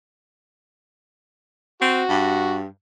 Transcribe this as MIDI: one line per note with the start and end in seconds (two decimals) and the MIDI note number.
1.82 2.03 60
1.82 2.57 66
2.09 2.65 43